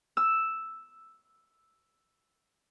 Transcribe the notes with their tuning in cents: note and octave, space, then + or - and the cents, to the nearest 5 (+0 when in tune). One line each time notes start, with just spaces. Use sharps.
E6 +0